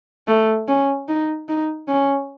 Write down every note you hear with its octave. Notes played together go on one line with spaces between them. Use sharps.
A3
C#4
D#4
D#4
C#4